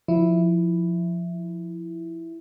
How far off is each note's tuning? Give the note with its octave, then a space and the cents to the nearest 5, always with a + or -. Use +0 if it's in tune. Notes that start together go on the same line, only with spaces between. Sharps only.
F3 +0 E4 +0